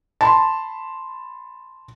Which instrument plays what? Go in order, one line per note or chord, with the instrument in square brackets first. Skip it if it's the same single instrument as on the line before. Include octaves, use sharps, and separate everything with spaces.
[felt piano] A5 B5 C6